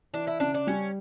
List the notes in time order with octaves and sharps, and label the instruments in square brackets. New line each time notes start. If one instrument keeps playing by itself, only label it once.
[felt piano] E3 [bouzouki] D4
[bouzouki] E4
[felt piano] C#3 [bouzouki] D4
[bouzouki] D4
[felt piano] G3 [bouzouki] C#4